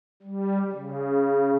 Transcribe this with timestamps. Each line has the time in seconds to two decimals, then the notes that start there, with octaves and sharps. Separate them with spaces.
0.22 G3
0.72 C#3